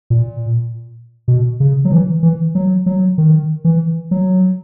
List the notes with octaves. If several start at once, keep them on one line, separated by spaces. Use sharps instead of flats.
A#2
B2
C#3
F#3
E3
E3
F#3
F#3
D#3
E3
F#3